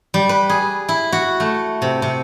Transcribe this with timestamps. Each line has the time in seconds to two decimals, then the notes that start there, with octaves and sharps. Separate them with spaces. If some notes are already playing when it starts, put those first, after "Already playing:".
0.14 G3
0.29 B4
0.49 G#4
0.89 E4
1.13 F#4
1.40 A3
1.82 C3
2.02 C3